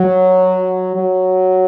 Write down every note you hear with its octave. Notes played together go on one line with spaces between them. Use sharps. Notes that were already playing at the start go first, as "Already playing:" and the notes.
Already playing: F#3
F#3